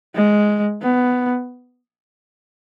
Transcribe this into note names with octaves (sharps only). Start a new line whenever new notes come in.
G#3
B3